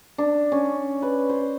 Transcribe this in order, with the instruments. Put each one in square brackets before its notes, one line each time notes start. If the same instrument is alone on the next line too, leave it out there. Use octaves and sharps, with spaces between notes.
[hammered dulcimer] D4
C#4
B4
C5